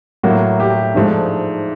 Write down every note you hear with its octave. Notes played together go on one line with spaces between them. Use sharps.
A2 F#3 A#3 F#4
G4
G#2 F3 A3 D4